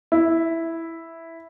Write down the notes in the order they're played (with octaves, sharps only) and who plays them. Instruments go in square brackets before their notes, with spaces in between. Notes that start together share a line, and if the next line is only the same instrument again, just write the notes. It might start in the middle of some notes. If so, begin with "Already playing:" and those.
[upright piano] E4